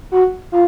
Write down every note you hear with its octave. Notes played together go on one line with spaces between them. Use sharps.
F#4
F4